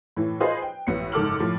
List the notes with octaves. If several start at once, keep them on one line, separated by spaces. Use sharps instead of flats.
A2 E3
F4 G#4 B4 C5 D#5
G5
A1 B3 C#7
F#1 G#2 A4 D6 F6 F#7
A2 F3